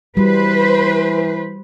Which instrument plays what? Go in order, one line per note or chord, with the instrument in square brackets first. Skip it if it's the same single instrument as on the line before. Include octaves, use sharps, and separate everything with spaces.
[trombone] E3 [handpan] G3 F#4 [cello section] B4 C5